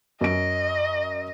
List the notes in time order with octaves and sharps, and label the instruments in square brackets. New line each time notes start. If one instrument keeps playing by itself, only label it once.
[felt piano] F#2 D7 [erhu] D#5